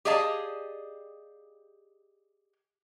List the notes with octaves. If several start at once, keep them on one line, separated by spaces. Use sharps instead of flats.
G4 G#4 D5 D#5 F5 A5